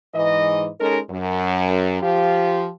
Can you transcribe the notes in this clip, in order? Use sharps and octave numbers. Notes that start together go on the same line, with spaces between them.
G#2 E3 D#5
G#3 C#4 D#4 A4 A#4
F#2
F3 F4 G4